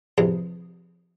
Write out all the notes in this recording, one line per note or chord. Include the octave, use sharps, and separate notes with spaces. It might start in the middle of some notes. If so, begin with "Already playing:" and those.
E2 C3 F3 G#4